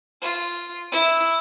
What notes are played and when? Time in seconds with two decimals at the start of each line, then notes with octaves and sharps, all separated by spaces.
0.22 F4
0.92 E4